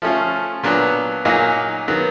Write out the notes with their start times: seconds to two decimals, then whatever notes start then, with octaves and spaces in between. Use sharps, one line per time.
0.02 F3 A3 C#4 F4
0.63 A#2 F#3 B3 D4
1.25 A#2 F#3 A#3 D#4 G#4
1.88 D#3 F#3 B3